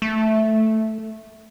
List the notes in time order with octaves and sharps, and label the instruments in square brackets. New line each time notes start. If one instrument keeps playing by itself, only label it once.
[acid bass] A3